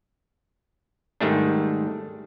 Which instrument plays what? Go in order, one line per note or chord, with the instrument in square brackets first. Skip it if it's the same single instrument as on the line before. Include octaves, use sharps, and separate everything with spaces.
[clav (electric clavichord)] G#2 D#3 G3 A3 D4